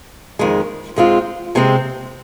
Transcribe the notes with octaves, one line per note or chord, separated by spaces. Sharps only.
F2 D#3 G#3
G#2 G#3 C4 F4
C3 G#3 C4